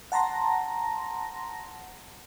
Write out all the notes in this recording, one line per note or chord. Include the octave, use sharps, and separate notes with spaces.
F#5 A5 A#5 C6 A#6